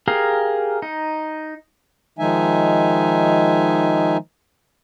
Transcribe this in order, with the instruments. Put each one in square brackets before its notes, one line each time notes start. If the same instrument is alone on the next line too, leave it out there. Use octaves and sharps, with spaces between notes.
[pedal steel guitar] G4 G#4 A#4 F5
D#4
[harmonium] D#3 F3 G#3 D#4 E5 G#5